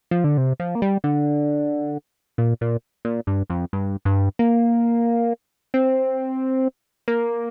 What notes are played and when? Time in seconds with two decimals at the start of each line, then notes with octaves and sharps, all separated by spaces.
0.11 F3
0.24 D3
0.38 C3
0.60 F3
0.75 A#3
0.82 G3
1.04 D3
2.38 A#2
2.61 A#2
3.05 A#2
3.27 G2
3.50 F2
3.73 G2
4.05 G2
4.39 A#3
5.74 C4
7.08 A#3